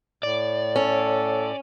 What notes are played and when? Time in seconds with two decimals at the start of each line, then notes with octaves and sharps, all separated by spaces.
0.23 A2 D5
0.76 C#4 A4